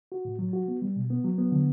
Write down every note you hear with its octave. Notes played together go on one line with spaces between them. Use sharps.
F#4
A2
F#3
F#4
B3
G3
B2
B3
F#3
B3
D3